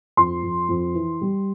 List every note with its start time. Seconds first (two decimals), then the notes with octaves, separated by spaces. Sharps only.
0.17 F2 C6
0.43 F2
0.69 F2
0.95 E3
1.21 G3